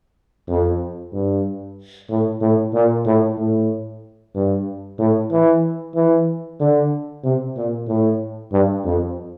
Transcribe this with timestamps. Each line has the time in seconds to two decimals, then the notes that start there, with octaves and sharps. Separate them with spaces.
0.48 F2
1.13 G2
2.09 A2
2.41 A2
2.74 A#2
3.06 A2
3.38 A2
4.35 G2
4.99 A2
5.31 E3
5.95 E3
6.60 D3
7.23 C3
7.57 A#2
7.88 A2
8.52 G2
8.85 F2